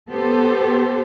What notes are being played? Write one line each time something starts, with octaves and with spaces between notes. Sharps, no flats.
B3 G4 A4 C5